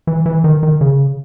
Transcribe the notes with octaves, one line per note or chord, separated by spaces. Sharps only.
E3
E3
D#3
D#3
C#3